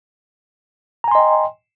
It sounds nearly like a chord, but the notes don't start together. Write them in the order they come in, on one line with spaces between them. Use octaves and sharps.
A#5 G#5 C6 D#5 G5